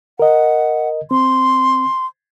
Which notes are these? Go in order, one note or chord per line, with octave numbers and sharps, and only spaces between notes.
A#4 D#5 F#5
C4 C6